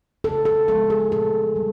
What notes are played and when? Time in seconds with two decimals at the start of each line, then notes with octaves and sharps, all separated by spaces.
0.24 C#3 A4
0.45 A4
0.68 F3 G#3 B3 A4
0.90 G#4
1.12 A#2 A4
1.56 G3